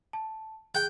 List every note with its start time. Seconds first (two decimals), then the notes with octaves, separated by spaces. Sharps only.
0.13 A5
0.75 G#4 G5 F#6